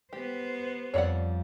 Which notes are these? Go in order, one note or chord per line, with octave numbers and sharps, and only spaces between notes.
B3 G4 C5
F2 G3 C#5 D5 F#5